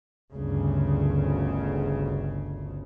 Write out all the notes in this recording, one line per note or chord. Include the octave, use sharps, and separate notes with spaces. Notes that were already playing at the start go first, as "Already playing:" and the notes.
G1 D2 C#3